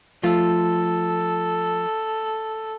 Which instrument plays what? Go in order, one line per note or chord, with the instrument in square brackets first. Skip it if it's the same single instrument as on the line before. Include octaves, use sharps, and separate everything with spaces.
[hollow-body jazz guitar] F3 A3 F4 [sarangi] A4